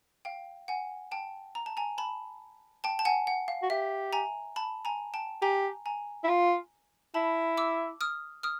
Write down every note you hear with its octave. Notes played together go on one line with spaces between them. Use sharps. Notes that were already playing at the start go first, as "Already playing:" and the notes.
F5 G5
F#5 G#5
G5 A5
A#5
A5
G#5 A#5
A5 B5
G5 A5
A5
F#5 G#5
F#5
F5
F#4
G4 E5
G#5 A#5
A5 B5
G#5 A#5
G5 A5
G4 G#5 A#5
G#5 A#5
E4
F4
E4 A5 B5
D6 E6
D#6 F6
D#6 F6